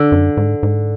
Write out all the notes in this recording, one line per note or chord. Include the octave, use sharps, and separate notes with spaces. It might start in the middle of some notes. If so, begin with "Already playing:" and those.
Already playing: D3
F#2
G#2
G#2